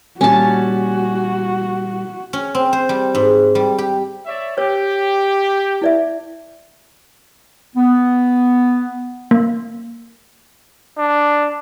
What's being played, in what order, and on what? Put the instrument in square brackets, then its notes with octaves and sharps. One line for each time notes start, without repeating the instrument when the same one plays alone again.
[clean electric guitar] A#2 G3 [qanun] C#4 A5 [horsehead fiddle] F#4
[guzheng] C#4
C4
C5
G3
G#2
G3
G4
[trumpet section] C#5 D5 E5
[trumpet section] G4 [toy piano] C#5
[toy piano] E4 D5 E5
[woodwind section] B3
[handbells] A#3
[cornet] D4